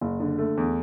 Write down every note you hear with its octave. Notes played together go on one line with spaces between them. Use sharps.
F#1
D3
A3
E2